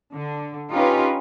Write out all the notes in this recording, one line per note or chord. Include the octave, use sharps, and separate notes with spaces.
D3
C#4 D#4 F4 G4 B4